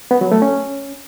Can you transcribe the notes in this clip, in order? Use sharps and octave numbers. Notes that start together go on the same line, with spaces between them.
B3
F#3
A3
C#4